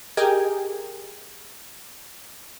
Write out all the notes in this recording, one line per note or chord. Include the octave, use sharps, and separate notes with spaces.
G4 G#4 A#4 D#5 G5 G#5